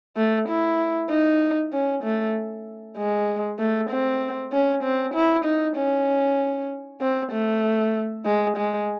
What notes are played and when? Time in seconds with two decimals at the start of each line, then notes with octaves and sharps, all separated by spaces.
0.17 A3
0.49 E4
1.10 D#4
1.73 C#4
2.04 A3
2.97 G#3
3.59 A3
3.90 C4
4.53 C#4
4.84 C4
5.14 E4
5.45 D#4
5.77 C#4
7.01 C4
7.32 A3
8.25 G#3
8.57 G#3